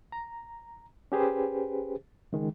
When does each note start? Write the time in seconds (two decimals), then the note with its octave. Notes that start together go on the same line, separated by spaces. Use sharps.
0.12 A#5
1.12 C#4 G4 G#4 B4 C5
2.32 C#2 D#3 G#3